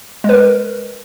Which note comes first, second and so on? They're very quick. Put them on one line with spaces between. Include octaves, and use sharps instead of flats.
G#3 B4 A#4